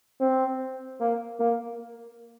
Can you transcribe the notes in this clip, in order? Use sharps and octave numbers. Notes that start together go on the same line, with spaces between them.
C4
A#3
A#3